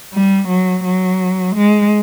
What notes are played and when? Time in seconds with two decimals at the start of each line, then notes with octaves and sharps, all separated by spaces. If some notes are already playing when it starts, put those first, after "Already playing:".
0.14 G3
0.48 F#3
0.84 F#3
1.56 G#3